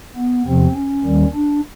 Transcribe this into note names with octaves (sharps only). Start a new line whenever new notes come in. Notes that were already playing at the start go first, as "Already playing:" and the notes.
B3
E2 C3 F3 C4
C#4
D#2 D#3 G3
D4